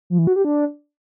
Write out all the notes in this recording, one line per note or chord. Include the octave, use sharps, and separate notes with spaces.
F3
E3
F#4
G4
D4